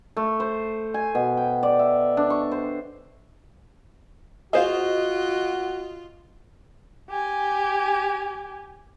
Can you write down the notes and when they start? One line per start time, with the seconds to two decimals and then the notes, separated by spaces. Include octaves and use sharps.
0.17 A3
0.40 C5
0.94 G#5
1.15 B2
1.37 G5
1.63 D5
1.79 E5
2.17 D4
2.30 C#6
2.51 C5
4.53 F4 F#4 G#4 C5 D#5 F5
7.09 G4 G#5